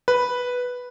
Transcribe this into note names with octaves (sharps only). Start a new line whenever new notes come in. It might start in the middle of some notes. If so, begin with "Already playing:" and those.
B4